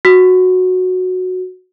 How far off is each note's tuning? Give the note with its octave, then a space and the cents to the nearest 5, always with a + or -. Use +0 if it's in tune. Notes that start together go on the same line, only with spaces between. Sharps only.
F#4 -10